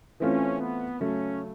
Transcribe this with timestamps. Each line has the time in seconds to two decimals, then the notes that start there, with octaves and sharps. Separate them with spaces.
0.20 E3 A3 C4 C#4 F4
0.60 B3
1.00 C#3 F#3 A3 C#4